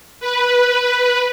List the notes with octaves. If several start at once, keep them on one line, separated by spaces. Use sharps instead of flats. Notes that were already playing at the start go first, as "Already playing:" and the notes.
B4